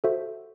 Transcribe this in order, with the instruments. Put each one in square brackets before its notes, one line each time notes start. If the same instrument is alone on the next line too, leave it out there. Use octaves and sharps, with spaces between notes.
[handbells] F#4 A4 C5 E5